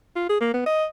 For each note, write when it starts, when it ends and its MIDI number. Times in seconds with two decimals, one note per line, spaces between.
0.16 0.27 65
0.29 0.38 68
0.41 0.53 58
0.54 0.62 59
0.66 0.85 75